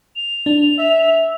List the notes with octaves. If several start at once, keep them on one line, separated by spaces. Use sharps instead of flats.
F7
D4
E5